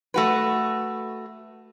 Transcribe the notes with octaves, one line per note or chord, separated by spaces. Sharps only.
A3 F#4 B4